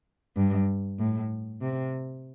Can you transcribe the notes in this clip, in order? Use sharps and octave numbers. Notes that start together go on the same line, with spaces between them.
G2
A2
C3